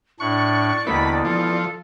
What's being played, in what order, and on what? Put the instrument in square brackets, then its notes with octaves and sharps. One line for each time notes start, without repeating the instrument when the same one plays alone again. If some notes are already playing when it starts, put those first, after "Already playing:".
[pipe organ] A2 D4 F#6 [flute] D5 [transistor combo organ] C#6
[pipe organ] D#2 D3 [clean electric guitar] B2 E3 [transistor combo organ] B5
[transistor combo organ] F3 [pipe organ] A4